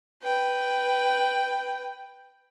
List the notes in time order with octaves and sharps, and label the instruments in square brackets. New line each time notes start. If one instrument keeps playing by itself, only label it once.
[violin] B4 G5